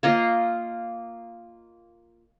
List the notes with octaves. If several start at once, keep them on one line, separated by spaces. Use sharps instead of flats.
A#3 F4 D#5